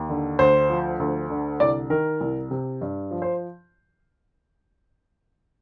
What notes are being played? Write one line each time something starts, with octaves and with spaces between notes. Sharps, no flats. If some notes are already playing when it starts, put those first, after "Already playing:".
Already playing: D#2
D3
D2 C5
F3
D2
D3
C2 D5
D#3 A#4
C2
C3
G2
F3
C5